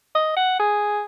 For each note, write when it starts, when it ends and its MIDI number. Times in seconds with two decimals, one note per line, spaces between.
0.15 0.33 75
0.36 0.57 78
0.59 1.02 68